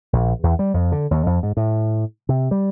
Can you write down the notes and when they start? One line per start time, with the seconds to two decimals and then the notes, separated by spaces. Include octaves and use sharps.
0.13 A#1
0.43 E2
0.59 G3
0.74 F2
0.92 D3
1.11 D#2
1.26 F2
1.43 G#2
1.57 A2
2.29 C3
2.51 G3